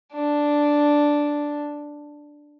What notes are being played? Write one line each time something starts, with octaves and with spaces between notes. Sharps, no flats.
D4